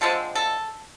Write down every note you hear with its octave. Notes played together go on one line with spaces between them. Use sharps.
D3 F3 G#3 C4 A4
A4